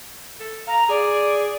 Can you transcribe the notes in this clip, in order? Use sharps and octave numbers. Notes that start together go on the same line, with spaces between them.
A4
F5 A#5
G#4 D5